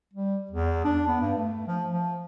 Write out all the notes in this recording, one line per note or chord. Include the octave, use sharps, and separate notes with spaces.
G3
E2
D4
B3
G2
A3
F3
F3